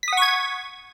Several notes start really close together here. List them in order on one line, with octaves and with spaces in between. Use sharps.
B6 D#6 F#5 C#6 G#6